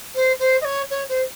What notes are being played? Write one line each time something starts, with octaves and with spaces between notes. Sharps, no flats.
C5
C5
D#5
C#5
C#5
C5